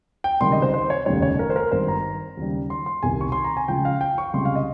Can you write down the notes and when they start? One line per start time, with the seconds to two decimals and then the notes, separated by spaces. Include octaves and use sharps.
0.24 G5
0.41 C#2 C3 D#3 G3 C6
0.52 D#5
0.62 C5
0.74 C5
0.90 C#5
1.06 F1 D#2 C#3 G3 C#5
1.22 C#5
1.39 A#4
1.50 C5
1.56 A#4
1.71 G#1 G2 D#3 G3 C5
1.88 A#5
2.37 D#2 C#3 G3
2.70 C6
2.86 C6
3.03 C2 C3 D#3 G#5
3.21 C#6
3.32 C6
3.44 A#5
3.57 G#5
3.68 C#2 C#3 F3 G5
3.85 F5
4.01 G5
4.18 C#6
4.34 C#2 C3 G3 C6
4.45 F5
4.55 D#5